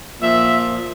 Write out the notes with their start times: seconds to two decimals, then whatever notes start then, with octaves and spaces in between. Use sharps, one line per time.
0.20 A#2 F3 E5